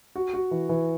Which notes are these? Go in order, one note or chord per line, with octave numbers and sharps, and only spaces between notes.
F#4
F#4
E3
E3